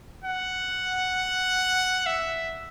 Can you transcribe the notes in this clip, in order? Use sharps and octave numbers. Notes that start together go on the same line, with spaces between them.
F#5
E5